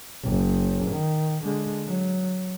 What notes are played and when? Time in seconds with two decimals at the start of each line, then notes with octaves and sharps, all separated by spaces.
0.24 F#1
0.91 D#3
1.44 D3 G#3
1.87 F#3